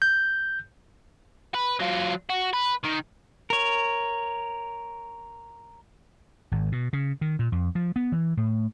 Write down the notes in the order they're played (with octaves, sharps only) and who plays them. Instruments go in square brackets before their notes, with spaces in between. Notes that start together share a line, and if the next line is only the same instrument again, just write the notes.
[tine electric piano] G6
[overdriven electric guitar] B4
F#3 F4
F#4
B4
D#3
[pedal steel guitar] A#4 C#5
[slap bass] G#1
B2
C#3
D#3
A#2
F2
F3
B3
E3
A2